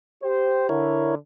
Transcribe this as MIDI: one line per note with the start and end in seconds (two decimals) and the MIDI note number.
0.23 0.68 67
0.23 0.68 72
0.69 1.16 50
0.69 1.15 64
0.69 1.15 70
0.69 1.15 73